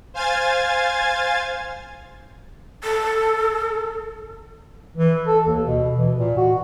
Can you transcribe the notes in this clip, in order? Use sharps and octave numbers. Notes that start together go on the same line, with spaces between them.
C5 F5 G#5 G#6 A6
A4
E3
A4
D#2
B2
E3
A#2
F#4